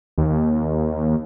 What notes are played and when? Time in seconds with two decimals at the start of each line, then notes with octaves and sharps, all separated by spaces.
0.18 D#2